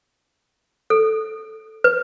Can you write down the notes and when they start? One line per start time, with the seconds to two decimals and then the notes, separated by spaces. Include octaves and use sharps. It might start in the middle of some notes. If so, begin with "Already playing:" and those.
0.90 A4
1.84 B4